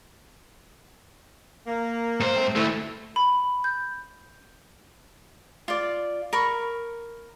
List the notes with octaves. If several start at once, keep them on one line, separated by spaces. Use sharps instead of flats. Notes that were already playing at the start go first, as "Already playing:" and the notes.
A#3
G#2 C5
A3 C4
D2 A3 E4
B5
G6
F4 D5
A#4 B5 C#6